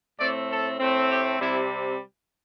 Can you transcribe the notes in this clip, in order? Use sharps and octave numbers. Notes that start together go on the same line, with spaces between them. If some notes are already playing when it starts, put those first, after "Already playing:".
A2 A3 C4 D5
A4
A2 A3 C4
G4
C3 G3 C4 E4